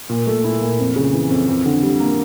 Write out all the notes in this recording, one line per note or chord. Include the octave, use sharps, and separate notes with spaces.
A#2
A3
E4
A#2
F2
C#3
E3
F2
F2
D3
G3
A#3